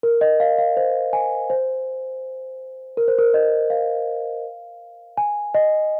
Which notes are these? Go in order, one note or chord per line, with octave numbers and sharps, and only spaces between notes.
A#4
D#5
F5
F5
C5
G#5
C5
A#4
C5
A#4
D#5
F5
G#5
D#5